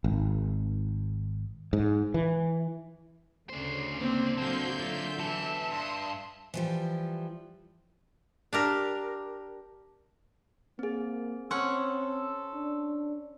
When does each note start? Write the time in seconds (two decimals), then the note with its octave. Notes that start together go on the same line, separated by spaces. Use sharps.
0.04 G#1
1.73 G#2
2.14 E3
3.49 D2 C#3 D4 C5
4.01 A#3 C4
4.38 D3 F#3 A#3 C4 F#4 G#4 A5 G6
4.80 F4 E5
5.20 B2 E3 A5
5.70 G2 C6 D#6
6.54 E3 F3 G3
8.53 D4 G4 A#4
10.79 A#3 C4 G#4
11.51 C4 C#4 A4 F#5 C6
12.54 D4